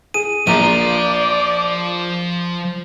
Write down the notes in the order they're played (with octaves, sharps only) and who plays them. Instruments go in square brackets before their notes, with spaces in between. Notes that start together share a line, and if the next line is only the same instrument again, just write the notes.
[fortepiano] G#4 [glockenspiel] D#7
[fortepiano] A#1 A#3 A#5 [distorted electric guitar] F3 F5 [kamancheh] D5 [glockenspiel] D#7